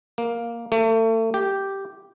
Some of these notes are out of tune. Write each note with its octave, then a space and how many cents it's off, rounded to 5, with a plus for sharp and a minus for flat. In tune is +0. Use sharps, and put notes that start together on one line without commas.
A#3 +5
A3 +35
G4 -5